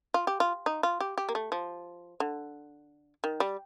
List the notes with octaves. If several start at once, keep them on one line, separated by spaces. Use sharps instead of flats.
F4
G4
F4
D#4
F4
G4
G4
A#3
A3
F3
D3
D#3
G3